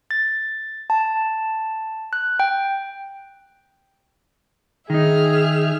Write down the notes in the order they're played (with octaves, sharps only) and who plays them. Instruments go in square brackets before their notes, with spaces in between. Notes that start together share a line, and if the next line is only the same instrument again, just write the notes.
[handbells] A6
A5
F#6
G5
[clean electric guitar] D#3 D#4 [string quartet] G#4 E5 F6